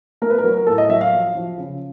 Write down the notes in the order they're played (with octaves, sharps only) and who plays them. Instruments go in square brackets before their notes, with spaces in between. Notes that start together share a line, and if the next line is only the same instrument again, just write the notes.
[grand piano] A3 A#4
B4
A#4
F#3
A#4
A2 A4
D#5
F#3 E5
F5
F3
F3
C#3